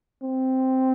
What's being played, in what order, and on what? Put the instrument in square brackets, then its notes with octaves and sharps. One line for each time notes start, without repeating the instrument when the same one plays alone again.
[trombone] C4